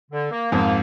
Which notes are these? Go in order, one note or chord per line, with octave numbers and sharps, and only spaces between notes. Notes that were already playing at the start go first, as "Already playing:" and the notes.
D3
A#3
F2 G#2 A#3